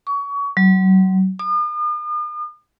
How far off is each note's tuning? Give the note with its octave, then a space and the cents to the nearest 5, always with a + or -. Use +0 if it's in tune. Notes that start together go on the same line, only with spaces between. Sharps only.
C#6 +30
F#3 +30
D#6 -45